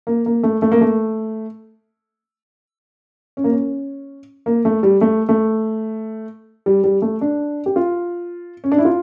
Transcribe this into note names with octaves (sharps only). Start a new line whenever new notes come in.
A#3
A#3
A3
A3
A#3
A3
C#4
A#3
C#4
A#3
A3
G3
A3
A3
G3
G3
A3
D4
G4
F4
C#4
D4
E4
F4